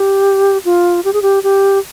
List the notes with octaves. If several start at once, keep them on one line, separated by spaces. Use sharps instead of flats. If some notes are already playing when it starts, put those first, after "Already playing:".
Already playing: G4
F4
G4
G#4
G4
G4